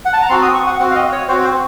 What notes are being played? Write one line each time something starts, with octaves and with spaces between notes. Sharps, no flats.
F#5
A5
A#5
C4 F#4 C6
D#6
C#6
F#5
C4 F#4 F#5
F5
D#5
C#5
C4 F#4 C5
C5